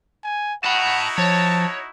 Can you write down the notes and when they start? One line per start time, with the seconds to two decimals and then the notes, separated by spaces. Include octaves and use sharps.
0.23 G#5
0.64 D#4 E4 F#4 F#5 A5 B5
1.18 F3 C#5 A5